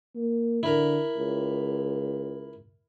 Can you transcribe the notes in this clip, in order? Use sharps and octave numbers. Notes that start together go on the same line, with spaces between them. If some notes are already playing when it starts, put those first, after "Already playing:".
A#3
D3 E4 A#4
C#2